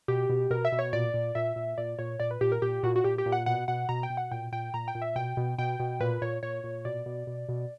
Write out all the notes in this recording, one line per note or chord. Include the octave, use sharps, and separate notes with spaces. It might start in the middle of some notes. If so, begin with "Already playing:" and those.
B2 G4
B2
B2 A#4
E5
B2
C#5
A#2 D5
A#2
A#2 E5
A#2
A#2 D5
A#2 C#5
A#2 D5
B4
A#2 G4
A#4
A#2 G4
A#2 F#4
F#4
A#2 G4
G4
A#2
F#5
B2 F#5
B2 F#5
B2 A#5
G5
B2
F#5
A#2 G5
A#2 G5
A#2 A#5
G5
A#2
E5
B2 G5
B2
B2 G5
B2
A#2 B4
A#2 C#5
A#2 C#5
A#2
B2 D5
B2
B2
B2